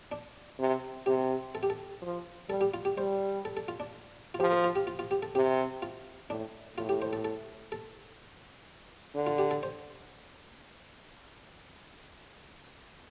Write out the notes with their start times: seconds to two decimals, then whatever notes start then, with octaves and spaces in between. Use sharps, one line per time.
0.12 D4
0.59 C3
1.06 C3 G4
1.55 A4
1.63 G4
1.70 A4
2.02 F3
2.49 G3 A4
2.61 G4
2.74 F4
2.85 G4
2.97 G3 C5
3.45 A4
3.57 A4
3.68 F4
3.80 D4
4.34 F4
4.39 F3 G4
4.52 A4
4.64 F4
4.76 G4
4.87 F4
4.99 F4
5.11 G4
5.23 A4
5.35 C3 G4
5.82 F4
6.30 A2 D4
6.77 A2 F4
6.89 G4
7.02 C5
7.13 A4
7.25 A4
7.72 A4
9.15 D3
9.27 F4
9.38 G4
9.51 A4
9.63 C5